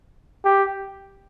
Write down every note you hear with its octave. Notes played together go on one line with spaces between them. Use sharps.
G4